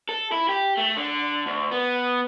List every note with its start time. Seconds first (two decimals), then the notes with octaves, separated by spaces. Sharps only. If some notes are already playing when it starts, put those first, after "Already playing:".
0.09 A4
0.32 E4
0.49 G4
0.77 A3
0.97 D3
1.46 D2
1.71 B3